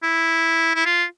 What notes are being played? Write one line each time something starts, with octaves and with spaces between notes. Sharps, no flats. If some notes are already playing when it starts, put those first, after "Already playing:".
E4
E4
F4